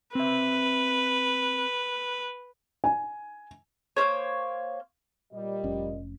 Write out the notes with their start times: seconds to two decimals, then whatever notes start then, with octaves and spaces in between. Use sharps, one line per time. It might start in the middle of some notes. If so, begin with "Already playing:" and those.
0.15 C4 B4 E5
2.84 G#5
3.97 A#3 E4 C5 C#5
5.33 A#2 G3 D#5
5.64 F1 C#4